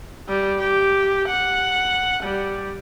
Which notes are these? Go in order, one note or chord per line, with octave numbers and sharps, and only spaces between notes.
G3
G4
F#5
G3